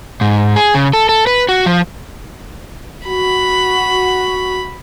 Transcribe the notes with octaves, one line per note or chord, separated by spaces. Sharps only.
G#2
G#4
C#3
A4
A4
B4
F#4
F3
F#4 B5